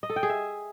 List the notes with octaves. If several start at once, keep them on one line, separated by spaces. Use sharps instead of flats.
D#5
A4
G5
G#4
E5